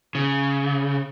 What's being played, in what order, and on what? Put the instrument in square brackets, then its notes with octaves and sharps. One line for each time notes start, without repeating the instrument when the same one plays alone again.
[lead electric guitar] C#3